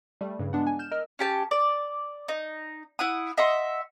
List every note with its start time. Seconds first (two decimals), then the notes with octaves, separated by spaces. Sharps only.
0.21 G3 A3
0.39 G2 C#3 E3 G3
0.53 G#3 B3 D4 F#5
0.67 G#5
0.79 F6 G6 E7
0.91 A#4 D#5 E6 F6
1.19 C#4 G4 A5
1.51 D5
2.28 D#4
2.99 E4 F#5 D#6
3.37 D#5 E5 F#5 C6